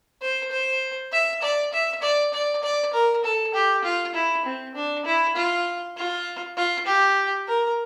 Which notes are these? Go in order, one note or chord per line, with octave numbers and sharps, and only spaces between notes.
C5
C5
E5
D5
E5
D5
D5
D5
A#4
A4
G4
F4
E4
C4
D4
E4
F4
F4
F4
G4
A#4